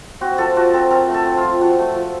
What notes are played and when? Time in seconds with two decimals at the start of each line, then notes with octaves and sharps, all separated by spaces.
0.21 C4 F#4
0.38 F3 A4
0.56 F3 F#4
0.73 C4 A4
0.90 C4 A#4
1.08 A3
1.14 A4
1.26 C4
1.37 F4
1.43 F3
1.61 F3 F#4
1.79 A3
1.95 F3